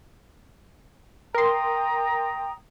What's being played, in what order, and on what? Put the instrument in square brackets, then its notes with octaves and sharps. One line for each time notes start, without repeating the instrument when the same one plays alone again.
[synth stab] A#4 C6 [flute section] G5 A#5 D#6